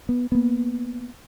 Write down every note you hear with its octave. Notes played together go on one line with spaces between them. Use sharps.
B3
A#3 B3